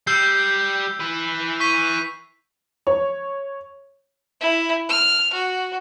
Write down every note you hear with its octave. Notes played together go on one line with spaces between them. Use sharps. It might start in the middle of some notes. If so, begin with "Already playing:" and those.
G3 E6 G6 C7
E4 B4
C#6 B6 D#7
C#5
E4
F6
F#4